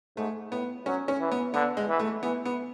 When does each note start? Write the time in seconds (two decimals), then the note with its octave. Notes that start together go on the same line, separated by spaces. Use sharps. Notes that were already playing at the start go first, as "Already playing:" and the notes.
0.17 G#2 A3
0.51 A2 B3
0.86 F#3 C#4
1.08 C#4
1.20 E3
1.32 B3
1.54 D3 B3
1.77 G#3
1.88 E3
2.00 A3
2.23 E3 B3
2.45 B3